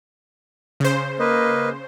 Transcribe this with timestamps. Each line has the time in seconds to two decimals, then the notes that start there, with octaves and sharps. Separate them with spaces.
0.80 C#3 C5
1.19 A#3 B4 D#5